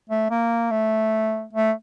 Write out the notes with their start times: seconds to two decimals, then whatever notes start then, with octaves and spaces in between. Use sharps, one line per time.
0.10 A3
0.31 A#3
0.71 A3
1.53 A3